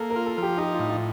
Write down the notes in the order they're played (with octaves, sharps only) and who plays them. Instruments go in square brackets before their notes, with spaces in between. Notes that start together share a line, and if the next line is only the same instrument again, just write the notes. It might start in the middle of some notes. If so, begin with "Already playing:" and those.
Already playing: [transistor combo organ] A#3 [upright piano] A4
[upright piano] A#4
[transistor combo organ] F4
[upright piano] A4
[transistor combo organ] F3
[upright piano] G4
[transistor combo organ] D#4 [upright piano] G4
[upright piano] F4
[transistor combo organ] A2
[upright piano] F4